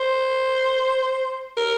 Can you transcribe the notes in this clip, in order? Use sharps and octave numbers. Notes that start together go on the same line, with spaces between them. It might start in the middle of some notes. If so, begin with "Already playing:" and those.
Already playing: C5
A#4